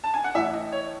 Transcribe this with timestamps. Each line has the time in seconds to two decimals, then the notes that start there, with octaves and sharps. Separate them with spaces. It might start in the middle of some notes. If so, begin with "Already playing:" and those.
0.04 A5
0.14 G#5
0.24 F#5
0.35 A2 E3 E5
0.53 D#5
0.72 C#5